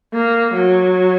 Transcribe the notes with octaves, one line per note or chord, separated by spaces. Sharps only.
A#3
F#3